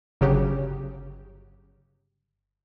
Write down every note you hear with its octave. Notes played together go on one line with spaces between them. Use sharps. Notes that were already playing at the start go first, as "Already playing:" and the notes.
G1 C#3 F#3 G4